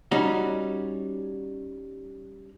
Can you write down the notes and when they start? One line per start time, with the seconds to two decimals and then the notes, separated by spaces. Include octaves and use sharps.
0.11 G3 C#4 D#4 F#4